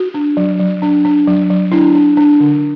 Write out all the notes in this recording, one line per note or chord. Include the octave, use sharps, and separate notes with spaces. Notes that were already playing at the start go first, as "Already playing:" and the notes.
Already playing: F#4
D4
F#3
F#3
D4
D4
F#3
F#3
D4 E4
D4
D4
D3